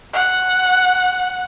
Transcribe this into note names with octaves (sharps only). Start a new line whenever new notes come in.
F#5